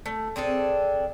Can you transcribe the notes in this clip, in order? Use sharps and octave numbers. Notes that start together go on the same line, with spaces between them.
A3
C4 D4 G#4 A4